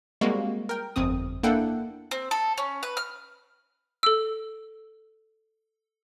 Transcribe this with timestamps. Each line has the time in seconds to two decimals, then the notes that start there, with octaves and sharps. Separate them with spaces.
0.21 G3 G#3 A#3 C4 F#4
0.69 A#4 G5
0.96 G1 F2 C4 D#6
1.43 A#3 D4 E4 A4 F#5 G5
2.11 C4
2.31 A4
2.58 C#4
2.83 B4
2.97 F6
4.03 A4 E6